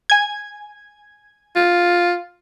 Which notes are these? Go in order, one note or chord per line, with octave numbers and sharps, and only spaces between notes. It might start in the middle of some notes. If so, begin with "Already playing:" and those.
G#5 G#6
F4